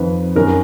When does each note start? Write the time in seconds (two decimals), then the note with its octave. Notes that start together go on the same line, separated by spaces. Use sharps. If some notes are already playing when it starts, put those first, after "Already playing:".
Already playing: F2 D#3 B4
0.36 F#2 D#3 A#4